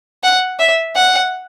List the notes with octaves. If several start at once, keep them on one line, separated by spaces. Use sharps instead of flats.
F#5
E5
F#5